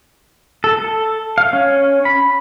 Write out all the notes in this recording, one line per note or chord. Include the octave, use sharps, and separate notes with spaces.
A4
A4
F5
C#4
B5